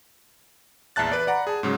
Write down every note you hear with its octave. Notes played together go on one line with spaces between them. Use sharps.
A#1 E2 E5 A5 F#6 A6
B4 D5
D5 F#5 A#5 B5
G#4 A5
G#2 C#3 F#3